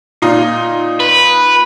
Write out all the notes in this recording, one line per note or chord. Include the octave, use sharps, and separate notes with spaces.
A#2 D#4 F4
B4